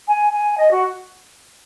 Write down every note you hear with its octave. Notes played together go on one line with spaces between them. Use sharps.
G#5
G#5
D#5
F#4